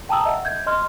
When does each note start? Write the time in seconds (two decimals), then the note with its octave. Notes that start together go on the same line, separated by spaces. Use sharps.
0.09 G5 A5 A#5 D#6 E6
0.25 D#5 E5 F#5
0.45 G6 G#6
0.67 D#5 C6 F6